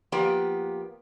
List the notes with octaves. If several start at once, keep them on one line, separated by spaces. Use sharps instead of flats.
F3 A#3 B3 G4 B4 D5